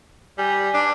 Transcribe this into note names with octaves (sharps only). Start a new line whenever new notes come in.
G3 G#5
D4